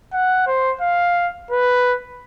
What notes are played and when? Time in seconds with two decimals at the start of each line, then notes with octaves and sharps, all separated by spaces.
0.13 F#5
0.47 C5
0.81 F5
1.51 B4